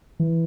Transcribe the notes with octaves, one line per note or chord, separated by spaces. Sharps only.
E3